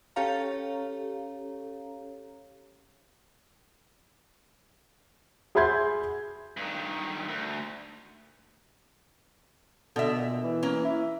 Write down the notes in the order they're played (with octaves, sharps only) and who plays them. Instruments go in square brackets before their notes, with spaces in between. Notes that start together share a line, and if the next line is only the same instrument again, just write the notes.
[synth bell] C#4 G4 A4 C#5 F5 A#5
[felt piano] G#4 E5 B5 C6 G6 G#6
[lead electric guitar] G2 D#3
D2
[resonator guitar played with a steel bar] B2 E5 [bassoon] D3
[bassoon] A#2
E3
[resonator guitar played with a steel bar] A#3 C#4
[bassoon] E4